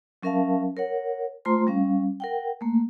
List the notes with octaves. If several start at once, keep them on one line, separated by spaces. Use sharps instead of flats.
F#3 C#4 A#4 E5 F5 A5
A#4 C#5 F#5
A3 F4 C5 A#5 C6
G3 C#4 F5
A#4 F#5 G5
A3 A#3